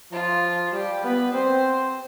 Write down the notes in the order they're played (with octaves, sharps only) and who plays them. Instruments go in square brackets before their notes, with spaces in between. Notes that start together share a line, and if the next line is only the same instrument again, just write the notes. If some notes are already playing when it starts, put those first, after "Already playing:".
[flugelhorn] F3 [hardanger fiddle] F4
[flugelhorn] G3 [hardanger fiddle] G4
[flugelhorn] B3 [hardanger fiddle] B4
[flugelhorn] C4 [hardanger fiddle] C5